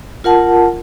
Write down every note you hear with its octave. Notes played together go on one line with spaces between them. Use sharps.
F4 A#4 F#5 A5